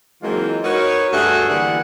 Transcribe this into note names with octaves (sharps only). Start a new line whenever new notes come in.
E3 F#3 G#3 A#3 C4 F4
D#4 F#4 A#4 B4 C#5
G2 G3 A3 F#4 G#4 A4
D3 E3 G3 A#3 G#4 F#5